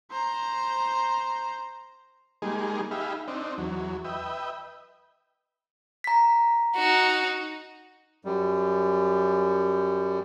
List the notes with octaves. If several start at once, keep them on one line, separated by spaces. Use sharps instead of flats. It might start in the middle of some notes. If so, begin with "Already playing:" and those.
C5 A#5
G3 G#3 A#3 D#4 G#4
D#4 G4 G#4 E5 F5 B5
C4 D4 D#4
E2 F#3
B4 D#5 E5 G5
A#5 B6
D#4 F#4
F#2 G3